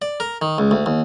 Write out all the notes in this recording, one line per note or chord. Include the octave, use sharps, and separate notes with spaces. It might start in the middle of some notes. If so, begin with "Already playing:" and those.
D5
A#4
D#3
C#2
D2
D#2